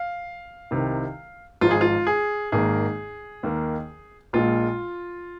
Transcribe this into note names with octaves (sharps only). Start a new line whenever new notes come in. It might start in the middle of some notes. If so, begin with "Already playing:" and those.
Already playing: F5
C2 C3 D#3
G#1 G#2 F3 G#3 F4
G#4
F4
G#4
G#1 G#2 D#3 A#3 G#4
D#2 D#3 A#3
A#1 A#2 G#3 F4